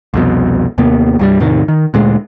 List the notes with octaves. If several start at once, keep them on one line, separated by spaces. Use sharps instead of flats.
C2 F2 B2
D#2 C3 A#3 B3
C2 G2 E3 G3
E2 A2 C3 D#3
D#3
D2 A#2 G#3